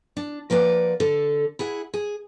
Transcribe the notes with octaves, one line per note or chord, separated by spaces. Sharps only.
D4
F3 A#3 B4 D5 F#5
D3 A4
E4 G#4 F#5
G#4